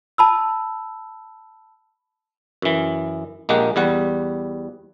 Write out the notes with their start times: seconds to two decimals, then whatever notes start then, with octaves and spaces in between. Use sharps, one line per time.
0.18 A5 B5 E6
2.62 F#2 E3
3.49 A#1 G#3 A#3 G4 F#5
3.76 E2 G3 F#5